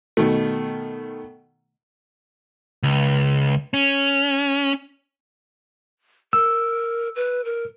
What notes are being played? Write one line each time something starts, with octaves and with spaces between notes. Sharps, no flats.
B2 D#3 A3
C#2
C#4
A#4 E6
B4
A#4